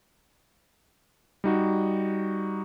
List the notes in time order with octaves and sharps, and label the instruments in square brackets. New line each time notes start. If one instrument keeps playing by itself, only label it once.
[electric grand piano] G3 D#4 F#4